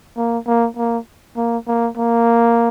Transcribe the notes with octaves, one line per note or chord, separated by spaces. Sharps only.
A#3
A#3
A#3
A#3
A#3
A#3